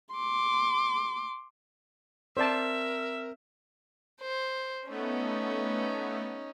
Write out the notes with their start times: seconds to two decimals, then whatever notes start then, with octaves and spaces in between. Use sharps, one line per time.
0.14 C6 D6
2.37 C4 A#4 C5 D5 E5 A5
4.22 C5
4.89 A3 B3 C#4 D#4